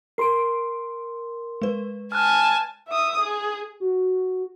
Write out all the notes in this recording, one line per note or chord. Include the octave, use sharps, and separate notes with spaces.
A#4 C6 C7 D7
G#3 B4
G#5 A5 F6 F#6
E5 D#6
G#4
F#4